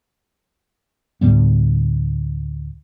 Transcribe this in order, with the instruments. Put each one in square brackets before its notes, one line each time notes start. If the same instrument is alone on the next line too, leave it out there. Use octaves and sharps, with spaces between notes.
[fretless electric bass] D2 A2 G3 B3